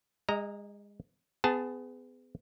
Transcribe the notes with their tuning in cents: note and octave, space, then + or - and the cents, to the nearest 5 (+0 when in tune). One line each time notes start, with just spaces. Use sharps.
G#3 -30 D#5 +25 A#5 +0
B3 +35 G#4 +0 A5 +0